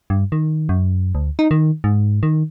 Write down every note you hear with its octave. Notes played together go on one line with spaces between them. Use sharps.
G2
D#3
F#2
D2
D#4
D#3
G#2
D#3